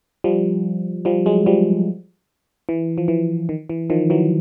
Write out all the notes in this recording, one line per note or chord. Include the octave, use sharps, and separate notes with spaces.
F3 G3
F3 G3
F#3 G#3
F3 G3
E3
F3
E3
D#3
E3
D#3 F3
E3 F#3